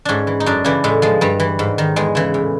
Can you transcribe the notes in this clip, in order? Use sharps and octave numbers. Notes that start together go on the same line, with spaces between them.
G#2 C#4 D4
E3
D#4
F#2 D4
C#3 E3 D4
A2 G#3
F3 G#3
G2 G3
E3
G#2
D#3
E2 G#3
C#3 E3
A2